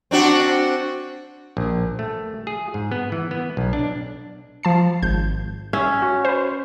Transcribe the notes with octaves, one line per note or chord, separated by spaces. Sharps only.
C4 D4 F#4
A#1
A3
G#4
G#2
B3
E3
B3
B1
D4
F3 A5 C7
G#1 G6
C#4 E5
F#4
B4 C5